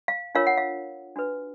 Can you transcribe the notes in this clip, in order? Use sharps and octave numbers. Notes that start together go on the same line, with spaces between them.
F5
D4 F4 A#4 C#5 F5
F#5
F5
D4 F#4 B4